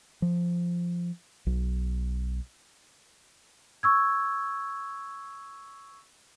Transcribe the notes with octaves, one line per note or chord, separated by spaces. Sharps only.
F3
B1
C#6 E6 G#6